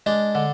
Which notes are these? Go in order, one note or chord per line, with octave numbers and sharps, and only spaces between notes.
G#3 D4
D3